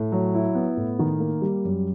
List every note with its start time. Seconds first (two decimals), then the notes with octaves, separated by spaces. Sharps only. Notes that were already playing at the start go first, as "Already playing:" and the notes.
Already playing: A2
0.12 F#3
0.34 E4
0.55 B3
0.77 A2
0.99 D#3
1.20 A#3
1.42 G3
1.64 F#2